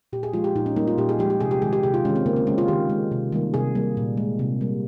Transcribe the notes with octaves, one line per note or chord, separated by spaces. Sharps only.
A#2 G4
G#4
F3 G#3 F4
G4
A#2 D#4
C#4
G3 A#3 D#4
F4
A#2 G4
G#4
F3 G#3 G4
G4
C3 G#4
G4
D#3 G#3 G#4
G4
C3 G4
F4
D#3 G#3 C#4
C4
C#3 A#3
C4
G#3 C#4
F4
D#3 G4
G#3
C3
D#3 G3 A#3
C3 G#4
G3 A#3
A#2
G#3
C3
G3 A#3